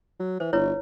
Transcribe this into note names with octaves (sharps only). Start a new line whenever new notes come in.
F#3
E3 C5
G1 E4 B4 C#5